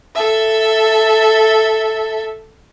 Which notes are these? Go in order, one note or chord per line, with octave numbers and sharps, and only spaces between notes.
A4 E5